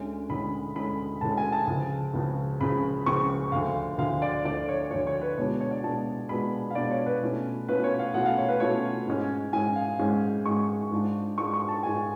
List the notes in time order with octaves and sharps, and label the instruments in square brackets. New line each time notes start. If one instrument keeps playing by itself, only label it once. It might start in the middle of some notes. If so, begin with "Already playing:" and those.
Already playing: [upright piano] D2 D3 G#3 C#4
D2 D3 G#3 C#4 B5
D2 D3 G#3 C#4 B5
D2 D3 G#3 C#4 A5
G#5
A5
C#2 C#3 F3
C#2 C#3 F3
C#2 C#3 F3 B5
C#2 C#3 F3 C#6
D2 D3 F3 F5
D2 D3 F3 F5
D5
D2 D3 F3 D5
C#5
D2 D3 F3 C#5
C#5
B4
B2 G#3 B3 D4 F4 C#5
C#5
D5
B2 G#3 B3 D4 F4 A5
B2 G#3 B3 D4 F4 B5
F5
B2 G#3 B3 D4 F4 D5
C#5
B4
B2 A3 C#4 F4
B2 A3 C#4 F4 B4
C#5
F5
B2 A3 C#4 F4 F#5
F5
C#5
B4
B2 A3 C#4 F4 C#5
G#2 G#3 C#4
G#2 G#3 C#4 G#5
F5
G#2 G#3 C#4
G#2 G#3 C#4 C#6
G#2 G#3 D4 F4
G#2 G#3 D4 F4 C#6
C#6
A5
G#2 G#3 D4 F4 G#5